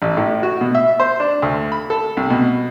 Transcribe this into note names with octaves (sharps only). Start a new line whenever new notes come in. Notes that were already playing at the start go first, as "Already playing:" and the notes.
A1
A2
F#4
B2
E5
C5
D4
D2
B5
A4
C2
B2